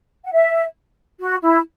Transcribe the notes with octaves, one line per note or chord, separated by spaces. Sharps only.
F#5
E5
F#4
E4